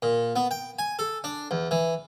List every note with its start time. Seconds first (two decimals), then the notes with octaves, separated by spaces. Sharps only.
0.02 A#2
0.36 B3
0.51 G5
0.79 G#5
0.99 A4
1.24 D4
1.51 E2
1.71 E3